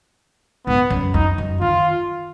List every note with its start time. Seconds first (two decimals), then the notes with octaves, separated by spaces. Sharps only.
0.67 G#2 B3
0.90 F#2
1.14 F2 D#4
1.38 F#2
1.61 D#3 F4